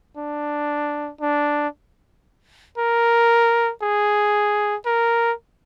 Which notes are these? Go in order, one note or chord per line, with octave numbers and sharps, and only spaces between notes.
D4
D4
A#4
G#4
A#4